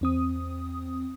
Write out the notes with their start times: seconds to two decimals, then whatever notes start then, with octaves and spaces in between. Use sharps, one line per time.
0.01 E2 C4 D#6